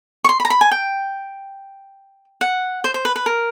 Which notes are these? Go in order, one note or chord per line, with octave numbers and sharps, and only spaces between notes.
C#6
C6
B5
A#5
B5
G#5
G5
F#5
C5
C5
B4
B4
A#4